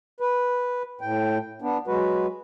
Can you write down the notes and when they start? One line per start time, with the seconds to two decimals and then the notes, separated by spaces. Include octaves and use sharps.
0.20 B4
1.01 A2 G5
1.62 B3 D4
1.87 F#3 G#3 F#4 B4